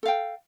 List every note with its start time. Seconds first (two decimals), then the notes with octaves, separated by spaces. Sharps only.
0.03 A4
0.05 F5
0.08 G5